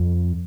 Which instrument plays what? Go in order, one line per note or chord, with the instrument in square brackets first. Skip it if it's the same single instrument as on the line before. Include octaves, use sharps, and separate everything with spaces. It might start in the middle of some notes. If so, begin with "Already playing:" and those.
Already playing: [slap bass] F2